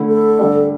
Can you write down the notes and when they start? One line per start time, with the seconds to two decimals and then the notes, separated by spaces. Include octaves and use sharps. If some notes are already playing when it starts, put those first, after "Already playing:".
Already playing: D3 A3 E4
0.09 A4
0.38 D3 G3 D4